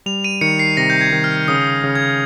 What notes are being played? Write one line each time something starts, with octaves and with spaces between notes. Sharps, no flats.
G3 F7
D#7
D#3 C#7
C7
C3 A#6
G6
G#6
D#3
F6
C#3 D#6
C#3
G#6